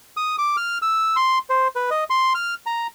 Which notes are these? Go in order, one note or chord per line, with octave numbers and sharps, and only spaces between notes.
D#6
D6
F6
E6
C6
C5
B4
D#5
C6
F6
A#5